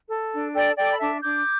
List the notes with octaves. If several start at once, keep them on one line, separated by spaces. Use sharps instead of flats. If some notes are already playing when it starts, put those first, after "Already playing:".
A4
D4
A4 D5 G5
A4 D5 G5
D6
B5
D4 E5 A5
D4 D6 G6